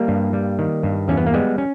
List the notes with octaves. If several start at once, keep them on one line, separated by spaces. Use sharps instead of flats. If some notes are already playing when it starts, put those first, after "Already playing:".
Already playing: G3 A#3
G2
G3
D#3
G2
E2 C#4
B3
A#3
G3 G#3 B3
C#4